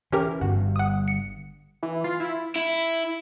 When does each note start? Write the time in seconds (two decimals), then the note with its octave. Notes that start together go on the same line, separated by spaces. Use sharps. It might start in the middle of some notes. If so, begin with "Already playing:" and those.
0.12 E3 C#4 G4 A#4
0.41 G1 G2 F#4
0.76 F#5 D#6
1.08 C#7
1.83 E3
2.04 F4
2.20 E4
2.56 E4